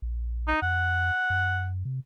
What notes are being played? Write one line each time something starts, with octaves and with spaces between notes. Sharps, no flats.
A#1
D#4
F2 F#5
F#2
C3